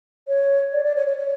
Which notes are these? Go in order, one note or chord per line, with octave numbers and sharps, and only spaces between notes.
C#5
D5
D5
C#5
C#5
C#5